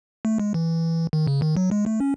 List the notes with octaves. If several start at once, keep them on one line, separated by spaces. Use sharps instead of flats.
A3
G#3
E3
D#3
C#3
D#3
F#3
G#3
A3
C#4